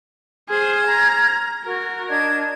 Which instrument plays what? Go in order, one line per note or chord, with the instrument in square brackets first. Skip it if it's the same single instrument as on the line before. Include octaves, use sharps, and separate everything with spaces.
[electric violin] G#4 C5 [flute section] F6 G#6
[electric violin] A#5
[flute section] F#4 [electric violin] A#4
[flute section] D4 D#5 G#6